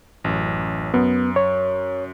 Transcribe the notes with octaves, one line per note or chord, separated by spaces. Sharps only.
A1 F#2
F#2 B3
C#5